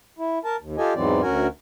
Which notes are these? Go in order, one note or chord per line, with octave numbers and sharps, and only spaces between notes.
E4
A#4 A5
D#2
F4 G4 A4 D#5 G#5
E2 G#2 E3 F#3 C4 D5
D2 C#4 F#4 A#4 G#5